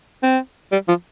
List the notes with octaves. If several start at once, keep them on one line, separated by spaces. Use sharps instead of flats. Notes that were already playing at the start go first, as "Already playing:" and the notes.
C4
G3
F3